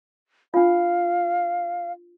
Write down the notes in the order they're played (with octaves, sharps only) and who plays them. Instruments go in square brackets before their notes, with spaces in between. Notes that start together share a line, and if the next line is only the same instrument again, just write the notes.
[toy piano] D4 F4 [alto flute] F5